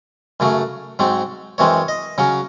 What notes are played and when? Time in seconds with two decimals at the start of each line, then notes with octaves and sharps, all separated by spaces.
0.40 F#2 C#3 F#3 A3
0.99 G#2 F#3 C4
1.58 F#2 E3 G#3 C4 C#5
1.88 D#5
2.18 C#3 F#3 C#4